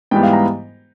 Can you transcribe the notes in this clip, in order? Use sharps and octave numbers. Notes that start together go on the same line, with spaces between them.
G#2 E3 G3 B3 G5
F5
A#5